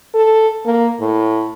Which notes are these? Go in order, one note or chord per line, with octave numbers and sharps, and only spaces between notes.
A4
A#3
A2